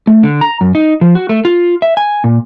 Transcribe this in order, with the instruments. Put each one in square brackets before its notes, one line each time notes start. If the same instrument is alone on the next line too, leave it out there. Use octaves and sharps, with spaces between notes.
[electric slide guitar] A3
D3
A#5
F#2
D#4
F3
F#4
A3
F4
E5
G#5
A#2